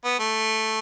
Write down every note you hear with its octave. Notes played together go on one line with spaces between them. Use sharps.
B3
A3